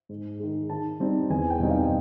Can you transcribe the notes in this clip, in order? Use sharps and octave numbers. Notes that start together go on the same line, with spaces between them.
G#2
D#3 G#3
D#3 A5
G3 C4 D#4
E2 G#5
G5
B2 G3 C4 D#4
F5